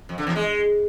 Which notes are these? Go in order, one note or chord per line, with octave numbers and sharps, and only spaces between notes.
F2
D3
E2
G#3